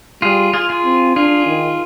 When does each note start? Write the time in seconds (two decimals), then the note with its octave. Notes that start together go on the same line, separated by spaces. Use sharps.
0.22 G3 F4 G#4
0.53 F4 G#4
0.69 F4 G#4
0.84 C4
1.15 D4 F4 G#4
1.46 D#3